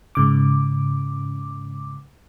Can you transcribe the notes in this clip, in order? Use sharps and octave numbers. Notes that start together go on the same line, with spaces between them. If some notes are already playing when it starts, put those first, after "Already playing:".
G#2 C#3 D6